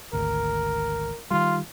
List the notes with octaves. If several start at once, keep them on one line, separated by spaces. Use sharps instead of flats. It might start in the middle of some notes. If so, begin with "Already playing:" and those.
G#1 D2 A#4
D#3 G3 F4